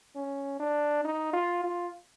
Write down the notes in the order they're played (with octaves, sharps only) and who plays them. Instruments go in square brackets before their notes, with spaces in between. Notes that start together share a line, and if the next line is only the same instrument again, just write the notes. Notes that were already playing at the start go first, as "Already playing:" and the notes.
[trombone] C#4
D4
D#4
F4
F4